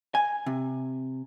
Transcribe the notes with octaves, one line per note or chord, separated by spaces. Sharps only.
G#5
C3